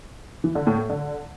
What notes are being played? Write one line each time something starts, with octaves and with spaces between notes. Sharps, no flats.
E3
D3
A2
A3
D3